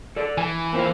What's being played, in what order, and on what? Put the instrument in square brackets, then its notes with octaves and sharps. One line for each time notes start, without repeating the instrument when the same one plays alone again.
[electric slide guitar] A4 D5
[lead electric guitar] E3 [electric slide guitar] G#5
[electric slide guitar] A#3 C4 F4